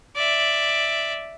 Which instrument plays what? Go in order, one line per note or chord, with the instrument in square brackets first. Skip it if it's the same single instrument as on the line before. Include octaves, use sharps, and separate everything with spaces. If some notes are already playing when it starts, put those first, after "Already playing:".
[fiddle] D5 E5